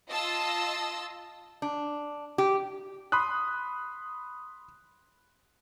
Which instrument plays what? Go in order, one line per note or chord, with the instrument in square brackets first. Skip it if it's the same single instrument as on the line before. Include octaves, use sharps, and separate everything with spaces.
[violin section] F4 D#5 A5 E6
[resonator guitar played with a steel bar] D4
G4
[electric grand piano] B5 C6 D#6 F#6